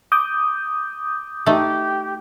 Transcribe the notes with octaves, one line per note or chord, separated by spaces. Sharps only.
D6 D#6 G6
A3 D#4 G4